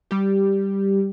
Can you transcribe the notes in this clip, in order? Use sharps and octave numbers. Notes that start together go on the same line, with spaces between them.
G3 G4